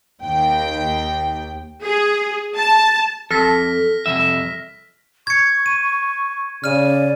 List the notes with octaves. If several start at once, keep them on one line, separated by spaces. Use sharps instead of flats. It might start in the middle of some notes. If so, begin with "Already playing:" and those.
D#2 G5
G#4
A5
F2 A4 F6 A#6 B6
C2 F2 E5
C#6 G#6 C#7
D#7
C#3 D5 F6 D#7